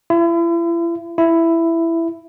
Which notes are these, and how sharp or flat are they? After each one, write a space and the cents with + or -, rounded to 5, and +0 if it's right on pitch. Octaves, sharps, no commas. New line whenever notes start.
E4 +40
E4 +10